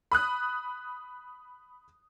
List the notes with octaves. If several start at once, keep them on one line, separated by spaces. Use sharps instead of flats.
B5 D#6 F#6